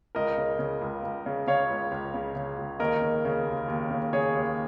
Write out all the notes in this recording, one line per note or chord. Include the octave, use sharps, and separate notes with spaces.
C#2 A#4 D#5
C#3
C#3
C#2
C#2
C#3
C#3 C#5 F5
C#2
C#2
C#3
C#3
C#2
D#2 A#4 D#5
C#3
C#3
D#2
D#2
C#3
C#3 G#4 C#5
D#2